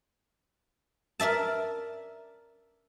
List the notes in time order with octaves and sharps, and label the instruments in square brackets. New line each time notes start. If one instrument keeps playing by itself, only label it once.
[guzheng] A#4 D5 E5 A5